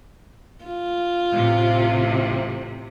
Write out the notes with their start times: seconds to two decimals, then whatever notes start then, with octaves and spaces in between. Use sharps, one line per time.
0.64 F4
1.32 A1 C3